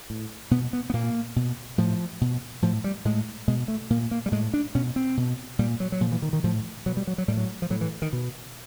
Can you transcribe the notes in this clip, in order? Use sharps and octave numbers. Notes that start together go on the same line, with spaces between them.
A2
B2 B3
B3
B3
A#2 A#3
B2
A2 F3
B2
A2 F3
G3
A2 G#3
B2 G#3
A3
A#2 A#3
A#3
G3
A2 G#3
D4
B2 C#4
C4
B2
A#2 G3
F#3
F#3
A#2 F3
E3
D#3
D#3
A2 F3
B2 F#3
G3
F#3
F#3
A2 G3
F#3
F3
A2 F#3
E3
D#3
B2